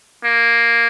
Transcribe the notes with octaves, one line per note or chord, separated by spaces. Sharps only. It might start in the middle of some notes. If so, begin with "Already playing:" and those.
A#3